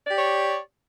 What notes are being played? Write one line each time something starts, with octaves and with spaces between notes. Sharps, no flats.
G4 C#5 D5